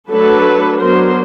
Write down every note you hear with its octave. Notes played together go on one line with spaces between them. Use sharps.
F#3 A3 D4 A4 B4
F#3 B3 D4 A#4 C5